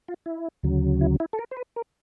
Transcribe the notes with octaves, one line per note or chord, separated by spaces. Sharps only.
F4
E4
D2 C#3 F#3
E4
E4
A4
A#4
C5
B4
A#4